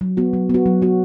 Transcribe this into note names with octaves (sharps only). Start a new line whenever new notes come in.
F#3
B3 F#4
F#3
B3 F#4
F#3
B3 F#4